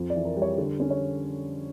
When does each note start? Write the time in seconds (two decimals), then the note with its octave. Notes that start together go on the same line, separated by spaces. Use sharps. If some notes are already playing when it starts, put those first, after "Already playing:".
Already playing: F2
0.10 E3 D5
0.25 A#4
0.36 G3
0.42 C#5
0.58 D3
0.80 C#4
0.90 C#5